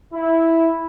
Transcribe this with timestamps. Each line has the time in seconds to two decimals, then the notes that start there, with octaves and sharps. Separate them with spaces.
0.13 E4